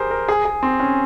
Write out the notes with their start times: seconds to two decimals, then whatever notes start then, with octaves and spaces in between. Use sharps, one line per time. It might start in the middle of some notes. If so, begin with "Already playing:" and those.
Already playing: G4 G#4 A#4 C5
0.11 A#4
0.29 G#4
0.45 G#4
0.63 C4
0.80 C#4